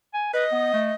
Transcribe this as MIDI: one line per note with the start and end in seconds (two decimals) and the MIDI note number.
0.14 0.31 80
0.34 0.45 71
0.34 0.93 75
0.52 0.69 59
0.73 0.92 57